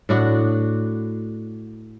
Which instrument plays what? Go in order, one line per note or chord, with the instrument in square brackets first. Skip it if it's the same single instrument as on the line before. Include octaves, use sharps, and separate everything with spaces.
[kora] A2 D4 F#4